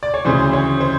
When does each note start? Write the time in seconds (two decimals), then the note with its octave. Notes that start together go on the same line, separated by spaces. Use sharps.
0.03 D5
0.14 C#5
0.25 D2 C#3 E3 C5
0.53 C#5
0.81 C5